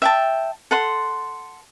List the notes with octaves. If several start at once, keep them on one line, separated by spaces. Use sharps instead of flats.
E5 G5 A5
A4 F#5 C6